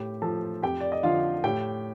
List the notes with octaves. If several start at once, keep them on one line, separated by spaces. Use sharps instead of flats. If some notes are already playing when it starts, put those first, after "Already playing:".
Already playing: A2 G4 G5
F3 A4 A5
F2 G4 G5
D5
D#5
D3 F3 F4 F5
A2 G4 G5